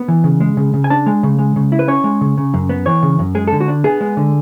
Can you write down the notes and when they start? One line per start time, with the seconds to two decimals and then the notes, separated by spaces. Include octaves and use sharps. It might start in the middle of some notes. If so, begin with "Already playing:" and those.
Already playing: B3
0.08 E3
0.24 C#3
0.40 G#3
0.57 C#3
0.74 C#3
0.84 G#5
0.90 D4 A5
1.06 G#3
1.23 C#3
1.38 G#3
1.56 C#3
1.72 E4
1.79 B4
1.88 C#4 C#5
2.04 G#3
2.21 C#3
2.38 C#3
2.54 F#2
2.69 B3
2.86 E3 C#5
3.03 C#3
3.19 F#2
3.35 G#3 G#4
3.47 A4
3.52 D3
3.60 F#4
3.68 D4
3.84 B3 G#4
4.01 G#3
4.17 D3